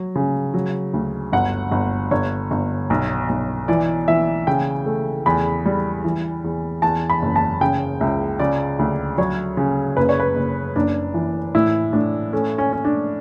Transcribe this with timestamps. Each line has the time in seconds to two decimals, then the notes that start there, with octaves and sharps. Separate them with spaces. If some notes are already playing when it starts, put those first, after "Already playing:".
Already playing: F#3
0.15 C#3
0.54 F#3
0.94 D2
1.33 G1 F#5
1.72 G1
2.11 G1 C#5
2.51 G1
2.90 B1
3.29 B1
3.68 E3 D5
4.08 E3 E5
4.47 C#3 G5
4.86 A3
5.26 E2 B5
5.66 G3
6.04 E3
6.44 E2
6.82 E2 A5
7.10 B5
7.22 F#1
7.36 A5
7.61 C#3 G5
8.01 C#2 E5
8.39 C#3 D5
8.79 D2
9.18 F#3 C#5
9.57 C#3
9.97 F#1 B4
10.09 C#5
10.20 B4
10.36 F#1
10.76 F#1 D4
11.14 E3
11.55 A2 E4
11.93 A2 D4
12.33 A3 C#4
12.58 C#4
12.73 C#4
12.85 D4